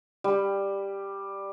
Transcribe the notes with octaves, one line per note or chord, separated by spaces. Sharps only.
G3